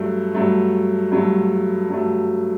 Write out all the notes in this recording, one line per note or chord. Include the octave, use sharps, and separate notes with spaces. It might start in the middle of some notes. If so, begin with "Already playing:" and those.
Already playing: G2 F#3 A3
G2 F#3 A3
G2 F#3 A3
G2 F#3 A3